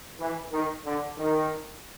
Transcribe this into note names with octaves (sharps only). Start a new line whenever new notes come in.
E3
D#3
D3
D#3